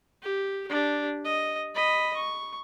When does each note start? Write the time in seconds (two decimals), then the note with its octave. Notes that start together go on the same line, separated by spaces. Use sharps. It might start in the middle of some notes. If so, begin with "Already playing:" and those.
0.22 G4
0.68 D4 G4
1.25 D#5
1.75 D#5 B5
2.16 C#6